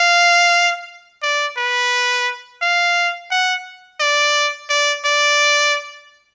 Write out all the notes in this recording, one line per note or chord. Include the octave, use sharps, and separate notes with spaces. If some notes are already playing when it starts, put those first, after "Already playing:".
Already playing: F5
D5
B4
F5
F#5
D5
D5
D5